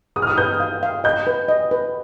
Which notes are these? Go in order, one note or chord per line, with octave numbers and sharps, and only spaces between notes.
G#4 D#6
F6
D#6
B4 G6
F5
F5
D#5 G6
B4
D#5
B4